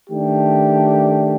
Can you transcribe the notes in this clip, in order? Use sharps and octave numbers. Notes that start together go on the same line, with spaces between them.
D#3 A3 D4 G4